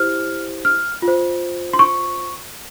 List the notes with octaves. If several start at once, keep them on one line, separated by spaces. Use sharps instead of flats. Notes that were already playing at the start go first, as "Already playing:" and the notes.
Already playing: E4 G4 C5 F6
F6
F4
C5
C6
C#6